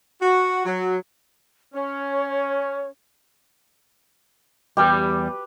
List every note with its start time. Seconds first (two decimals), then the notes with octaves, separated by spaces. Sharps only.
0.22 F#4
0.66 F#3
1.74 C#4 C#5
4.77 E2 G3 G4 B4